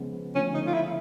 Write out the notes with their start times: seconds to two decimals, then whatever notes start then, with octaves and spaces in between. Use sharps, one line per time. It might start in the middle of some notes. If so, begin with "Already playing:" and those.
Already playing: C#3 F3 G#3 B3
0.35 D3 F3 A3 C#4
0.54 D#4
0.67 F4
0.74 E4